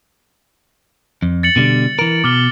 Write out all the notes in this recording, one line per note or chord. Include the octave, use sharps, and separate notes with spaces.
F2
A6 C#7 F#7
B2 D3 G3
E3 A#4
B2 D6 F6 G7